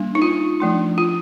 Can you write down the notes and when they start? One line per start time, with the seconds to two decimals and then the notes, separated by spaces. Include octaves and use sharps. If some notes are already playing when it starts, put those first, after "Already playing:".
Already playing: G3 A#3 D4
0.15 D#4
0.22 F4
0.60 F3 A3 D4
0.98 F4